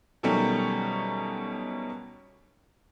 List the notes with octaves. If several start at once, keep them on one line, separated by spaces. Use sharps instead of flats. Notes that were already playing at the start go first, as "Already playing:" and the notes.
B2 D#3 F#3 G3 A3 C#4